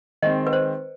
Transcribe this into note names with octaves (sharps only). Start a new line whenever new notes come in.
D#3 G#3 C4 D#5
B4
C5